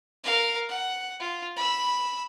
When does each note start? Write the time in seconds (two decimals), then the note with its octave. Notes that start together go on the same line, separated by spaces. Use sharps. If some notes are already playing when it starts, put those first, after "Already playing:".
0.24 A#4 F5
0.69 F#5
1.20 F4
1.56 B5 E6